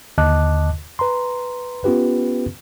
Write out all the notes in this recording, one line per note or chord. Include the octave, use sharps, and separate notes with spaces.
D#2 D3 D#5 A5 D6 F#6
B4 A#5 C6
B3 C#4 F4 G4 B4